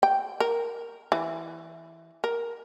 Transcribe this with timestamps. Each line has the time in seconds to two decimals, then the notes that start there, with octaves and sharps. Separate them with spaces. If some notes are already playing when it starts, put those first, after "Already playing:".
0.03 G5
0.40 A#4
1.12 E3
2.24 A#4